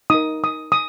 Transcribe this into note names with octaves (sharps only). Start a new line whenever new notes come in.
D#4 A#4 D#6
D#6
D#6